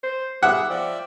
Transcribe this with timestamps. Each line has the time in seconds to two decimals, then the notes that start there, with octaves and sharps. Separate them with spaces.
0.03 C5
0.43 B3 G4 G#4 E5 F#5
0.70 F3 D5 E5 G5